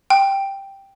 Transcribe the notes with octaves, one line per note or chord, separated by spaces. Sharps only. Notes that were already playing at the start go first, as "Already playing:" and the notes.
G5